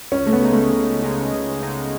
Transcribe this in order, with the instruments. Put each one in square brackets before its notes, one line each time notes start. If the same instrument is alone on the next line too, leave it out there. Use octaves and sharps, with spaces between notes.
[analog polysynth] C#2 [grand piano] C#4
[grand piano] A3
B3
[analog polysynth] C#3 G#3 D#4
[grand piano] A3
[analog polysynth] C#2
C#3 G#3 D#4
C#2
C#3 G#3 D#4